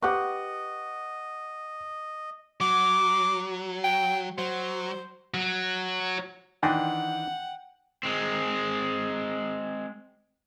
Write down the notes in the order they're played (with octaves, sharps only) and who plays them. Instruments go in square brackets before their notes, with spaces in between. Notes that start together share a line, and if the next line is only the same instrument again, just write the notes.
[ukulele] G4 B4 [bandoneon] D#5 [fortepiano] F#5 C#6
[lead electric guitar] F#3 [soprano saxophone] D6
[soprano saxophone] G5
[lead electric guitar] F#3 [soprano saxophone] C5
[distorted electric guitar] F#3
[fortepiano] D#3 C6 F#6 [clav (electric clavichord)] E3 D4 D#4 [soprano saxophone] F#5 [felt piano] G5
[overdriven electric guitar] G#3 C4